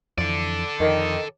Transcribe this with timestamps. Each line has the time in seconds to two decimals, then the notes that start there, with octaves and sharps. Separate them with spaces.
0.18 F2 E3 A4 D5
0.80 F2 D#3